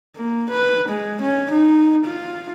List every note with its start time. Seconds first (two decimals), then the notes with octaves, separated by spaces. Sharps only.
0.16 A#3
0.49 B4
0.88 G#3
1.21 C#4
1.51 D#4
2.05 F4